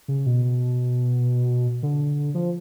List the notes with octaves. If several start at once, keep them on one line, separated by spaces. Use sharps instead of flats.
C#3
B2
D3
F3